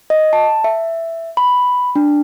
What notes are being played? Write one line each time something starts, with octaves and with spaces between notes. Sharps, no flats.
D#5
A5
E5
B5
D4